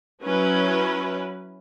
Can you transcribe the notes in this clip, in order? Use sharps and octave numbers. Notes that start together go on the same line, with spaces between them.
F#3 C#4 E4 B4